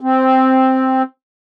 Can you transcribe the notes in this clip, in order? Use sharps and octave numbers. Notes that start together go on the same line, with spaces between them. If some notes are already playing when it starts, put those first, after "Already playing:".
C4